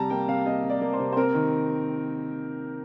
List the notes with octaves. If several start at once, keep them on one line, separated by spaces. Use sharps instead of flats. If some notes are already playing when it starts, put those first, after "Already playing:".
Already playing: C3 G3 A5 A#5
A#3 G5
C3 F5
A#3 D#5
C3
D5
A#3
C5
C3
C5
C4 A#4
D#3